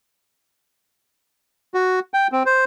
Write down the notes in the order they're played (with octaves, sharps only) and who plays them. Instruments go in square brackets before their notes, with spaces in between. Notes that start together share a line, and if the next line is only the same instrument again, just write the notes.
[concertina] F#4
G5
C4
C5